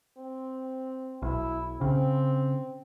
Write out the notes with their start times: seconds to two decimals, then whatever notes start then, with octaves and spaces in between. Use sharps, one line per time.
0.18 C4
1.22 B1 E4
1.81 C#3 C4